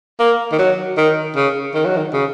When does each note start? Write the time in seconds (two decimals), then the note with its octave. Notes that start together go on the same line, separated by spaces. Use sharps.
0.20 A#3
0.52 D#3
0.59 F#3
0.97 D#3
1.36 C#3
1.74 D#3
1.86 F#3
1.97 D#3
2.13 C#3